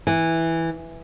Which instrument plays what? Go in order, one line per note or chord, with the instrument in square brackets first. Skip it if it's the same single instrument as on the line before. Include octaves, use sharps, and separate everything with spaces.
[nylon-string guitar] E3